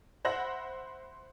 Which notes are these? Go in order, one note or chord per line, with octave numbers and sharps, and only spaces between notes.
C5 E5 F#5 B5 F#6 A#6